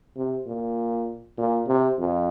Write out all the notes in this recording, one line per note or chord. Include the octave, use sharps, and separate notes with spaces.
C3
A#2
A#2
C3
F2